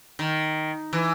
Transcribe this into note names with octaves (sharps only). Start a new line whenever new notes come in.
D#3
E3